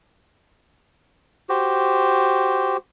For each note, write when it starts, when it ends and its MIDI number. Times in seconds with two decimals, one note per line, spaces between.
1.49 2.77 66
1.49 2.77 67
1.49 2.77 72